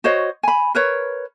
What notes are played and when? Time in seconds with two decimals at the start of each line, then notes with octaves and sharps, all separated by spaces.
0.04 F#4 C5 C#5 D#5
0.43 G#5 B5
0.75 A#4 B4 C#5